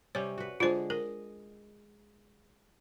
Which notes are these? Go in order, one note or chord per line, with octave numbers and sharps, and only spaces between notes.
C3 G3 C#4 C#5
F#4 B4
D3 G#3 F4 C5
A#4 D#5